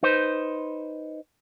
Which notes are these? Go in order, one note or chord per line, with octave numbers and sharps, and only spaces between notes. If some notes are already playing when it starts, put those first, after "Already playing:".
D#4 B4 C5